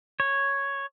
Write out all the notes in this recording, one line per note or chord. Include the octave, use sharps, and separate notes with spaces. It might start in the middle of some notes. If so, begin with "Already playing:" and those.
C#5